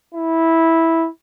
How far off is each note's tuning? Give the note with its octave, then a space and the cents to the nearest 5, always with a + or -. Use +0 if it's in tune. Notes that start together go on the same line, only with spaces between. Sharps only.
E4 -10